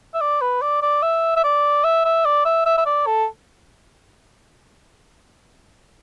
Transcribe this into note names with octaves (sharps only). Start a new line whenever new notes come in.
E5
D5
B4
D5
D5
E5
E5
D5
E5
E5
D5
E5
E5
E5
D5
A4